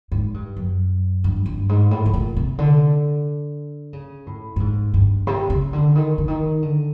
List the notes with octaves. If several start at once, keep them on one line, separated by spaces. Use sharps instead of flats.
G#2
G2
F#2
G2
G2
G#2
A2
A2
A#2
C3
D3
C#3
A2
A2
G#2
G2
C3
C#3
D3
D#3
D3
D#3
D3